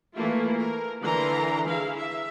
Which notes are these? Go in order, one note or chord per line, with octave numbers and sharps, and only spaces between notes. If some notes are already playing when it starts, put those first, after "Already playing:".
E3 A3 A#3 E4 F4
A#4
D3 E3 A#4 A#5 C6
E4 G#4 F5
E5